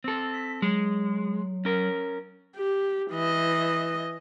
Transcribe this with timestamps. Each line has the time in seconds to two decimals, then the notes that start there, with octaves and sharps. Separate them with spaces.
0.04 C4 A4
0.33 B6
0.62 F#3 G#3
1.65 C#4 A#4
2.56 G4
3.11 E3 D#5